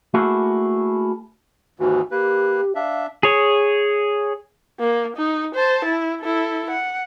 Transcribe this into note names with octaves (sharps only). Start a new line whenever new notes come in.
A3 A#3 E4 F#4 G#4
D#2 G#2 E3 F#4
A#3 G4 B4
D4 E5 F5
G#4 C#5
A#3
D#4
C5 A5
E4
E4 A4
F#5